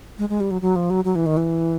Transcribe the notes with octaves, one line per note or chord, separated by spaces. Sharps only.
G#3
G#3
G3
F#3
F#3
F3
F#3
F#3
E3
D#3
E3